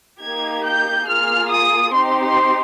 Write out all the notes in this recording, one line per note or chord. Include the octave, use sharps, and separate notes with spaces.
A#3 D#4 G4 G#6
G6
A#3 F4 G#4 F6
D#6
C4 D#4 G4 C6
C6